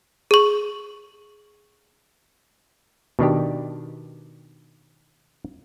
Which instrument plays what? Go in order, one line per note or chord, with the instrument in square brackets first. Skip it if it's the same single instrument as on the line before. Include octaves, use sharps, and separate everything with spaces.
[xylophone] G#4 C#6
[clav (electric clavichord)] B2 D#3 D4 G4